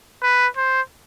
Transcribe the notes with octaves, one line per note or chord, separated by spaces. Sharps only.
B4
C5